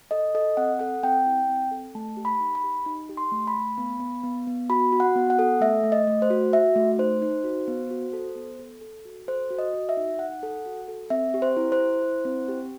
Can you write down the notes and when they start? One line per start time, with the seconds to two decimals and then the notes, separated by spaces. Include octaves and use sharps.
0.11 A4 D#5
0.35 A4 D#5
0.57 C4 F#5
0.79 A4 F#5
1.03 C4 G5
1.26 E4
1.49 C4
1.71 A4
1.95 A3 A5
2.17 G4
2.25 B5
2.40 D#4
2.55 B5
2.64 G4
2.86 D#4
3.09 G4
3.17 C6
3.31 A3
3.47 B5
3.54 A3
3.78 B3
4.00 B3
4.24 B3
4.47 B3
4.70 F#4 B5
4.92 F#4
5.00 F#5
5.15 B3
5.30 F#5
5.39 A4
5.61 A3 E5
5.84 A3
5.92 D#5
6.07 A3
6.22 C5
6.30 F#4
6.53 F#4 E5
6.76 A3
6.98 D#4 C5
7.22 D#4
7.44 F#4
7.68 B3
7.91 F#4
8.13 A4
8.35 B3
8.60 A4
8.81 A4
9.05 F#4
9.28 A4 C5
9.51 F#4
9.58 D#5
9.73 F#4
9.89 E5
9.97 D#4
10.19 D#4 F#5
10.43 A4
10.66 F#4
10.88 A4
11.10 C4 E5
11.34 G4
11.42 C5
11.57 E4
11.72 C5
11.80 E4
12.02 E4
12.25 C4
12.49 G4